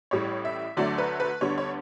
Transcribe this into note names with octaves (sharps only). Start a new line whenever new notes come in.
A1 A2 G3 C#5
E5
D2 D3 F#3 A3 D5
B4
B4
D2 D3 G3 B3 C#5
C#5